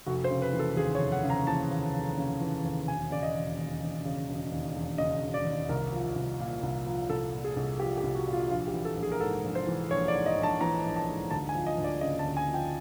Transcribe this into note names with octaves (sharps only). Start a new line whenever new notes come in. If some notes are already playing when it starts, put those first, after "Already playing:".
F1 F#4
C5
C#3
B4
E3
A4
D#2 G#4
C#5
F1
F#5
C#3
A#5
E3 A5
D#2
F1
C#3
E3
D#2
E1 G#5
C#3 D5
D#5
E1
D#2
E1
C#3
E1
D#2
E1
C#3 D#5
E1
D5
D#2
C2 A#4
F3
C2
A#2
C2
F3
C2 A4
A#2
G#4
C2
F3 G4
G4
C2
F#4
A#2
F4
A#1 F4
G4
E3
A4
A#1
G#4
A#4
G#2 A4
A#1
C5
E3
A#1 C#5
D5
G#2
D#5
A#1
A5
E3 A#5
A#1
A5
G#2
D2 A5
G#5
F3
D#5
D2
D5
C#3 D#5
A5
D2
G#5
F3
G5